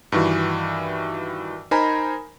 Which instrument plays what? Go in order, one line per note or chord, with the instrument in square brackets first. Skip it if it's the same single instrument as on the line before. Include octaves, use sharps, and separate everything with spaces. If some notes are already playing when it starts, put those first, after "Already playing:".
[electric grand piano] G2 D#3 E3 F#4
D#4 A#4 C5 G#5 A#5 B5